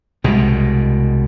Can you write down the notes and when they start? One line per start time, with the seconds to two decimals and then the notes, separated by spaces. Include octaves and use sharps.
0.24 C2 B2 G3 G#3